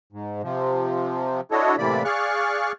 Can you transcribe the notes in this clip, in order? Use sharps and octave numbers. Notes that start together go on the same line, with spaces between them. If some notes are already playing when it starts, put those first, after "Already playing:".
G#2
C3 F3
D4 E4 F#4 A4 C#5 D#5
A2 C3 E3 A#3 D5 B5
G#4 D5 F5 C#6 F6 F#6